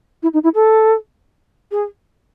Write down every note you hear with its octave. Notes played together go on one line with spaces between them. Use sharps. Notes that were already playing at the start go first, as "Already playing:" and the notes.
E4
D#4
E4
A4
G#4